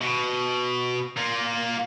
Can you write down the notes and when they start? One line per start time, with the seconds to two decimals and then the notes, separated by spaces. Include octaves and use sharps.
0.01 B2
1.17 A#3 F4